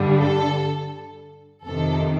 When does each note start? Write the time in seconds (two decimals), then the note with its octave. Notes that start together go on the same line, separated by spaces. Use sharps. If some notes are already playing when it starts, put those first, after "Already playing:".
Already playing: G2 D3 G3
0.19 A4
1.66 F2 C3 D#3 A4